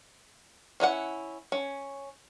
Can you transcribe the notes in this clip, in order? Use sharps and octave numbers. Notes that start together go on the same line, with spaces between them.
C#4 E4 F4 F#5
C#4